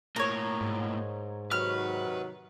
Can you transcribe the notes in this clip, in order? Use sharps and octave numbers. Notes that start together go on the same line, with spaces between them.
A2 A#3 A#4 C#5
G#2
C3 D#3 F#3 B4 F6